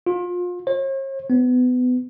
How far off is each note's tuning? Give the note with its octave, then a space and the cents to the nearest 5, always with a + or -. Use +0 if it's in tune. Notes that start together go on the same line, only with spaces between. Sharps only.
F4 +30
C#5 -45
B3 +25